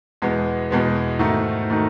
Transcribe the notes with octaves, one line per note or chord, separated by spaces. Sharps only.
E2 B2 G#3 B3
E2 B2 G#3 B3
G#2 D#3 A3 D#4 F#4
D#3 A3 D#4 F#4